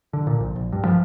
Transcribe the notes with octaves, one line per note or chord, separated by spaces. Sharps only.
D3
A#2
A#1
A#1
G2
F3